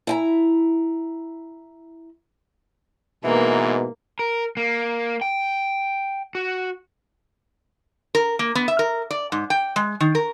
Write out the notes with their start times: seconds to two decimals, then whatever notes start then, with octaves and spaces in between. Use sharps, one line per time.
0.07 E4 G#5 A#5
3.24 G#2 B2 E3 A#3
4.19 A#4
4.57 A#3
5.21 G5
6.35 F#4
8.15 A#4
8.39 A#3
8.55 B3
8.68 E5
8.79 A#4
9.11 D5
9.32 G#2
9.50 G5
9.76 G#3
10.00 D#3
10.15 A#4